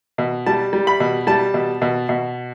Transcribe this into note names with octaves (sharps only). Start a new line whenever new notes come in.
B2
G3 A5
G3
B5
B2
G3 A5
B2
B2
B2